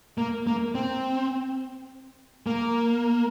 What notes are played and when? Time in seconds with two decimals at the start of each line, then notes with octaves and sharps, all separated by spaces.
0.18 A#3
0.47 A#3
0.75 C4
2.47 A#3